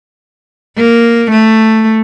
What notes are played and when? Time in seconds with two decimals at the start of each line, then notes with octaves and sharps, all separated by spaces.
0.77 A#3
1.31 A3